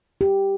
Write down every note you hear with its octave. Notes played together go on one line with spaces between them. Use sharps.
G4